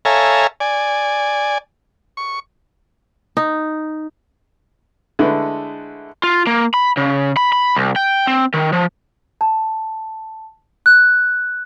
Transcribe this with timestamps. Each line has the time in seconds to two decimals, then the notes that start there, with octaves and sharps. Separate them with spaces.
0.05 A4 C#5 E5 F5 G#5 A#5
0.60 D5 G#5
2.17 C#6
3.37 D#4
5.19 D3 G#3 A3 E4 B4
6.23 F4
6.47 A#3
6.74 B5
6.97 C#3
7.37 B5
7.52 B5
7.76 C2
7.96 G5
8.27 C4
8.54 D#3
8.73 F3
9.41 A5
10.86 F#6